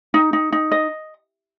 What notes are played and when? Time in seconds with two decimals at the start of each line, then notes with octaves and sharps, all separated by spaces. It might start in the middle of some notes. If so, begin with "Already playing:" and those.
0.14 D#4
0.33 D#4
0.52 D#4
0.72 D#5